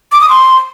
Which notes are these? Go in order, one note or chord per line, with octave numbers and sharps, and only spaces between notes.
D6
D#6
C6